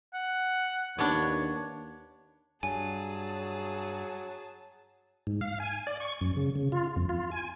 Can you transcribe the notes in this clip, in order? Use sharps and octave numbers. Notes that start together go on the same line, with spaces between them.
F#5
D#2 B3 D4 C#5
G2 F#3 G#4 G#5 A5
G#2
F5
G#5
D5
C#6
F#2
C#3
C#3
F4
F2
F4
G#5